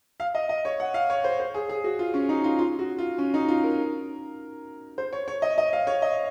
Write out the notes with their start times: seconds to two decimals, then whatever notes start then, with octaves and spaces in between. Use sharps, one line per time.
0.20 F5
0.35 D#5
0.49 D#5
0.65 C#5
0.80 F#5
0.94 F5
1.10 C#5
1.24 C5
1.40 C5
1.54 G#4
1.69 G#4
1.84 F#4
1.99 F4
2.14 C#4
2.29 D#4
2.44 F4
2.59 F4
2.79 F#4
2.98 F4
3.18 C#4
3.34 D#4
3.48 F4
3.63 A#4
4.98 C5
5.13 C#5
5.28 C#5
5.42 D#5
5.58 D#5
5.73 F5
5.87 C#5
6.02 D#5